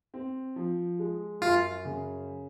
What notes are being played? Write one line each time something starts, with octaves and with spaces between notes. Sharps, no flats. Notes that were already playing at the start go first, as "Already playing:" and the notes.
C4
F3
G#3
F#2 F4
C#3